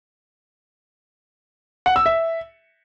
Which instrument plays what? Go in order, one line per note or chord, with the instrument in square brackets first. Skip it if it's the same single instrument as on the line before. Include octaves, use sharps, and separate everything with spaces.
[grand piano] F#5
E6
E5